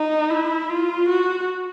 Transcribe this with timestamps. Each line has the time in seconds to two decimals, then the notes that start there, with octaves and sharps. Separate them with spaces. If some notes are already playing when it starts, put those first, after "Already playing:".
Already playing: D#4
0.31 E4
0.70 F4
1.09 F#4